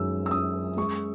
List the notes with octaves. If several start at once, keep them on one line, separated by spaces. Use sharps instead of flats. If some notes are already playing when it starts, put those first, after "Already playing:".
Already playing: F#2 D#3 G#3 E6
E6
C#4 D#6
G#3 C#6